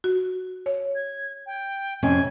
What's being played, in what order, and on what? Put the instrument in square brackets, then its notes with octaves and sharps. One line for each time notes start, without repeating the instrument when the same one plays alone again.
[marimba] F#4
C#5
[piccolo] G#6
G5
[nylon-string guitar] F2 C3 C#4 [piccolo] G#5